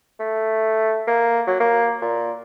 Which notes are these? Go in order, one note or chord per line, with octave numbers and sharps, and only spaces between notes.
A3
A#3
F#3
A#3
A#2